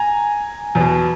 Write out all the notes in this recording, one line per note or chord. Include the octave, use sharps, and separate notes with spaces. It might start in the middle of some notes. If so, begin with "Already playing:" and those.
Already playing: G#5 A#5
E2
B2